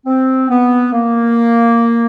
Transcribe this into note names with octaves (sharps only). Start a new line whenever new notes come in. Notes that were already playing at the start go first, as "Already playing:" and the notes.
C4
B3
A#3